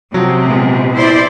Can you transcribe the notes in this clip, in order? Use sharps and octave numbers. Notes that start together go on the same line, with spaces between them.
C3 F3 F#3
A#2 G#3 B3
E4 C5 D5